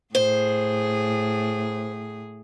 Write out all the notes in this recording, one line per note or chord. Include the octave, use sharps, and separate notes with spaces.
A2 G#4 C5